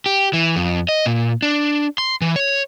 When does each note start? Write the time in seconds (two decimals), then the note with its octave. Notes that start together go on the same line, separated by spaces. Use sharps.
0.06 G4
0.33 E3
0.56 F2
0.89 D#5
1.06 A#2
1.42 D4
1.98 C6
2.22 E3
2.36 C#5